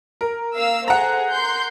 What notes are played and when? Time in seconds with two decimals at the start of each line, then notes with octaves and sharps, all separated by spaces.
0.21 A#4
0.57 A#3 F5 E6
0.88 G#4 A4 C5 F#5 A#5
1.31 A#4 C6 G6